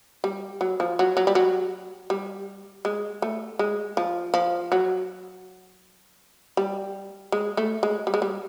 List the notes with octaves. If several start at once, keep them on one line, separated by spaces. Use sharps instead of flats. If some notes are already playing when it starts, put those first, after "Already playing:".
G3
F#3
F3
F#3
F#3
G3
F#3
G3
G#3
A3
G#3
F3
F3
F#3
G3
G#3
A3
G#3
G3
G#3
G3